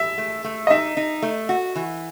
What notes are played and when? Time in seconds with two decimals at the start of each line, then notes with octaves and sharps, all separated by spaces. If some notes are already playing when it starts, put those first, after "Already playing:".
Already playing: E5
0.18 A3
0.45 A3
0.67 D#5
0.70 D#4 E5
0.97 D#4
1.22 A3
1.49 F#4
1.76 E3